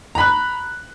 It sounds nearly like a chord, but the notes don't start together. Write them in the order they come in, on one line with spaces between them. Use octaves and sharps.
A#5 B5 F#6